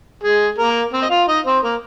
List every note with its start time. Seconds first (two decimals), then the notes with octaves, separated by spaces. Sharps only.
0.23 G#3 G#4
0.58 A#3 A#4
0.93 C4 C5
1.02 D#5
1.10 F4 F5
1.27 D#4 D#5
1.46 C4 C5
1.63 A#3 A#4